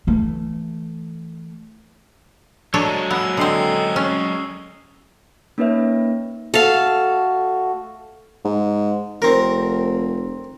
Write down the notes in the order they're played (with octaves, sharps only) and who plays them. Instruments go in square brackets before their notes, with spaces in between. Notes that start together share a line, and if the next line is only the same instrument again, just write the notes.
[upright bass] E3 A3
[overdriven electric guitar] F#3 G#3 [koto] D4 A4 C#5
[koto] B3 [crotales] E6 F7
[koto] D3 C4 [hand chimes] A4 D#5 G5 [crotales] D#6 C7 G7
[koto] C#4 [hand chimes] C#6
[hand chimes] A#3 C#4 D#4 B4 C#5 E5
[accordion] A3 F#4 [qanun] A4 F5
[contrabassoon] G#2
[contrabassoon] F1 [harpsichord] C4 A#4